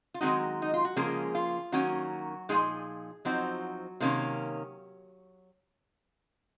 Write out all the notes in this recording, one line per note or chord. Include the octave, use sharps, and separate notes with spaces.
F4
D#3 F#3 G#3 C4 D#4 F#4
D#4
F4
F#4
C#3 F3 G#3 A#3 C#4 G#4
F4
D#3 F#3 A#3 C#4 F#4
A#2 F3 G#3 D#4 G#4
F3 F#3 C4 D#4 F#4
C3 D#3 A#3 C#4